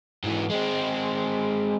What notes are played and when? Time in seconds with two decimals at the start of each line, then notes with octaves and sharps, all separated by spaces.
0.24 G#2 E3
0.50 G#3 C4